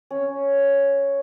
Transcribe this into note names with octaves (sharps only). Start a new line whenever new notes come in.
C#4